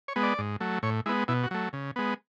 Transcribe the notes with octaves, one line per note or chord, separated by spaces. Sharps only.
C#5
G#3 B3
D5
G#2
F#3 A3
A2 C#5
G#3 B3 E4
B2 E4
F#4
F#3 A3
C#3
G#3 B3